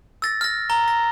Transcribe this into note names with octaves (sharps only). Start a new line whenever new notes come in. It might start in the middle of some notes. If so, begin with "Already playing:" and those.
E6 A6 A#6
F6 A#6
A#5 G7
A#6